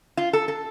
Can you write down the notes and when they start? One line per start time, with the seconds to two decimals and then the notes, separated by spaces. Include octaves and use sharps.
0.17 F4
0.33 A4
0.48 A4